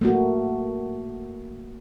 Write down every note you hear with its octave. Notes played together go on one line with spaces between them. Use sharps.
A3 A#3 F#4